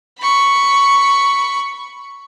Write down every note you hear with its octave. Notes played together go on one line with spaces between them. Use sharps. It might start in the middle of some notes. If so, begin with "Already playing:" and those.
B5 C#6